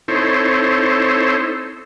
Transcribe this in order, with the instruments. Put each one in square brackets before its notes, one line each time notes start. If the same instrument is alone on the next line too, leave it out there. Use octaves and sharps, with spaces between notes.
[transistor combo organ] C4 D#4 E4 A4 C5 C#5